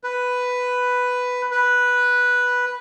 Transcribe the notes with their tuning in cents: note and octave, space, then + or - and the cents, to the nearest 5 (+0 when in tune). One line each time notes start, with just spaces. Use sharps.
B4 +5
B4 -5